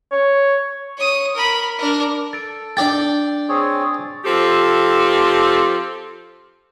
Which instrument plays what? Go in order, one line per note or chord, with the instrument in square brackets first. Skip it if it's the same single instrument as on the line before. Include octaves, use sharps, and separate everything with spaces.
[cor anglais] C#5
[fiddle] C#5 D#6
A#4 B5
D4 A#4
[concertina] A4 [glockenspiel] A6 D7
[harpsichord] D4 D5 G5 [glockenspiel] A6
[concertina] C4 G#4 C#5
[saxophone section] F3 C4 G4 A4